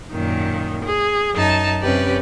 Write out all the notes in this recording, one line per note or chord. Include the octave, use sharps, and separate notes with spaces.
F#2 A#2 D#3
G#4
F#2 D#4 A5
F#2 C3 C#4 G4 B4 D5